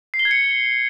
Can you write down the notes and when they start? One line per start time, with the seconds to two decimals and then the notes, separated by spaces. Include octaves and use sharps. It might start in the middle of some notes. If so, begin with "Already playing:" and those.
0.14 C7
0.19 G7
0.25 G#6
0.31 C#7